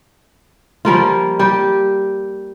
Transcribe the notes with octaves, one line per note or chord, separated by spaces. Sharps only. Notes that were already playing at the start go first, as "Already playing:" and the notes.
F3 G3 A#3 F4
G3 G4